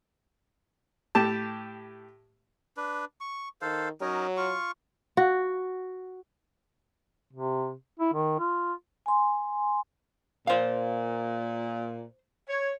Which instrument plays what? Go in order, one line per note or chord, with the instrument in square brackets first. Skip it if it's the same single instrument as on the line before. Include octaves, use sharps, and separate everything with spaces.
[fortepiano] A2 G4 A5
[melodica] D4 B4
C#6
[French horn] D#3 [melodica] A4 C5 F5
[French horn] F#3 [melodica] C#4 D#4 A#4
[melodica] F4 C#6
[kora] F#4
[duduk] C3
E4
D#3
F4
[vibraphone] G#5 C6
[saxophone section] A#2 [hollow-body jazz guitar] C5 F5
[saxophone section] C#5